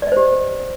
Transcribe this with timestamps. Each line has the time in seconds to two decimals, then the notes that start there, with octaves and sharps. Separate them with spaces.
0.02 D5
0.07 D#5
0.12 C5
0.17 G4